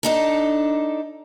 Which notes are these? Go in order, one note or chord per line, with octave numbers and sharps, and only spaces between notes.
D4 D#4 A4